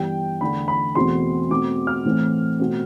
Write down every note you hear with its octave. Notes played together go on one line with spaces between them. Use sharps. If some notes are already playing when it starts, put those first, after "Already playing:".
Already playing: G2 E3 G3 B3 G5
E2 D3 A3 B5
B5
E2 B2 A3 C4 C6
B2 A3 C4 D6
F6
A2 E3 A3 C4
B2 A3 C4